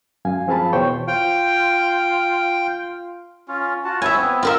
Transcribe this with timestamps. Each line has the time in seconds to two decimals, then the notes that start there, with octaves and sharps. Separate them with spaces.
0.25 F#2 F5 G#5
0.47 F3 C4 G#4 F5 A5 B5
0.73 E2 B2 C5 C#5 G5 C#6
1.08 F4 G5
3.48 C#4 F4
3.84 F4 F#4 A5
4.02 E4 C#5 E5 G#5
4.16 B3 C4
4.43 F4 A#4 E5